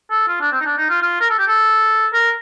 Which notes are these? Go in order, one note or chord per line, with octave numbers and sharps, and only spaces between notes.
A4
F4
D4
C4
D#4
D4
D#4
F4
F4
A#4
A4
G4
A4
A#4